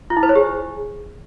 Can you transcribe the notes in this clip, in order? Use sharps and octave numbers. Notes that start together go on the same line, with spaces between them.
F4
E4
C5
C#5
G#4